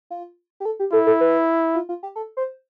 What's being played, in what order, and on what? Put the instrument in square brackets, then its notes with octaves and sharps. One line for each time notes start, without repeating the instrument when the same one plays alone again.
[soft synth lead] F4
G4
A4
G4
[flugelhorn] E4 [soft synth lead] A4
[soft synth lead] A4
B4
F4
F4
G4
A4
C5